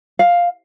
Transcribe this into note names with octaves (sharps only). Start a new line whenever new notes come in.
F5